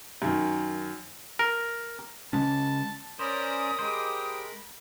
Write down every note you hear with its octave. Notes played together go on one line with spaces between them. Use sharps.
F#2 D#3
A#4
C#3 G#3 C#4 A5
C#4 A#4 C5 D5 A#5 B5 D#6
G#3 G4 C5